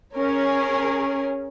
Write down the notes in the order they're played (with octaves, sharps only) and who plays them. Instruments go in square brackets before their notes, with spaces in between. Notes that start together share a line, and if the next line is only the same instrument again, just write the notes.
[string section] C#4 G#4 A#4 C#5